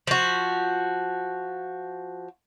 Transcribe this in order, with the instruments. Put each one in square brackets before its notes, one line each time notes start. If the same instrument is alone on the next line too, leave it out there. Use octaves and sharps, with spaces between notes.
[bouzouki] F3 F#4